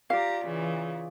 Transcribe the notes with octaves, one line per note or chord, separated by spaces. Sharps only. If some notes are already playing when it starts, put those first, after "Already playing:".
F4 G4 D5 F5 A#5
C#3 E3